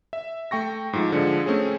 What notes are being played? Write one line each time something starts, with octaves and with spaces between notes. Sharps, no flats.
E5
A3 G5 C#6 A#6
G#2 F3
D3 F3 G#3
A3 C4 C#4 G#4